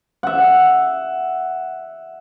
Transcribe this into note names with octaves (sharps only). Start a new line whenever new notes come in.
E5 F#5